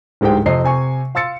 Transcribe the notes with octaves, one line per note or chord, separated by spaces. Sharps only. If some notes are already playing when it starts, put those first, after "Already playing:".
D1 G#2 G#3 G4 C5 G5
F2 C3 D#5 C7
C3 G#5 C#6
F5 C6 E6 A6 C#7